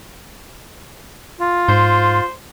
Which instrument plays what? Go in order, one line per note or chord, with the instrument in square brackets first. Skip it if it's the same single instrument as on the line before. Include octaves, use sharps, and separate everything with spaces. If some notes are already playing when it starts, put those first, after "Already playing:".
[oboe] F4
[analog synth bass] G#2 [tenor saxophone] C5